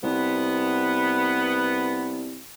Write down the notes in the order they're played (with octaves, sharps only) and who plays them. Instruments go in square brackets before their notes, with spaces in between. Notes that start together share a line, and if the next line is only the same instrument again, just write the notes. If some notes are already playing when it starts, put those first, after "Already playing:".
[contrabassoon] C2 [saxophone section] B3